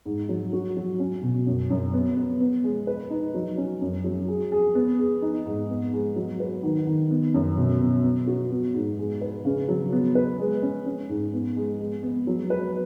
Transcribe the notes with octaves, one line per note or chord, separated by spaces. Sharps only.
G#2
F#3
F#4
F#3
C#4
B2
F#2
F#2
B3
B3
B3
G#3
B4
D#4
F#3
C#4
F#2
F#3
G#4
G#4
B3
G#4
D#4
G#2
B3
G#3
F#3
B4
D#3
D#3
B3
F#2
B2
B2
B3
F#4
B3
G#2
G#3
B4
C#3
F#3
B3
B4
G#3
C#4
C#4
G#2
B3
G#3
G#3
B3
F#3
B4